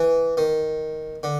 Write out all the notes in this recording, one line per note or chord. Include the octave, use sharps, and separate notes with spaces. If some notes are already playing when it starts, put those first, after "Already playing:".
Already playing: E3
D#3
D3